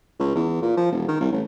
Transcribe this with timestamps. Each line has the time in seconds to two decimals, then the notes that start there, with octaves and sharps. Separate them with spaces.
0.20 C#2
0.35 E2
0.62 A#2
0.77 F3
0.92 E1
1.08 D#3
1.21 C2
1.32 A1